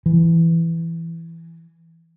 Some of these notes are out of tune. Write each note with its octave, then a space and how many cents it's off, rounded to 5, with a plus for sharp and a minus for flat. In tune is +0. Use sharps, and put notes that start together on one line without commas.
E3 +10